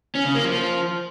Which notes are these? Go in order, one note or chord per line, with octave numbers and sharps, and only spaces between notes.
C#4
C#3
A#3
F3